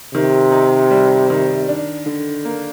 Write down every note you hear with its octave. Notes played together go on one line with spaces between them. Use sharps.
C3 D#3
D#4
G3
D#3
D4
D3
A#3